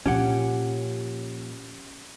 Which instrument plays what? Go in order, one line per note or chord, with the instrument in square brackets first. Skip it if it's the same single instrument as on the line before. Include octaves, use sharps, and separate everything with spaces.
[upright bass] A#2 F3 [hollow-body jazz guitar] C#4 G4 F#5